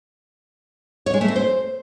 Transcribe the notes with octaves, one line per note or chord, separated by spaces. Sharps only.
C#5
G#3
A3
C4
C5